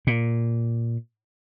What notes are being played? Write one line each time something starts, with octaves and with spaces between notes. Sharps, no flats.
A#2